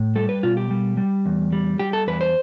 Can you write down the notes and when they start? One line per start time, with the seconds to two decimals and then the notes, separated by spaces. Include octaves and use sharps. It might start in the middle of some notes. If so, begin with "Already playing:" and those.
Already playing: A2
0.15 G3 A4
0.29 B4
0.43 B2 F4
0.57 G4
0.71 G3
0.97 G3
1.26 E2
1.53 G3
1.79 G3 G4
1.93 A4
2.07 E2 B4
2.21 C5